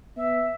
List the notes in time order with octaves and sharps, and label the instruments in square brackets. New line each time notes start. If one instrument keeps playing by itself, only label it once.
[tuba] B3 [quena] E5